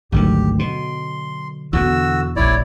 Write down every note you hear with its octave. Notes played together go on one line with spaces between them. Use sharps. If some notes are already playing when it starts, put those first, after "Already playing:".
G#1 D2 D3 D#3 F#3 G4
B2 C6
E2 B2 D3 B3 F#4 E6
F1 A#1 E4 C#5 D5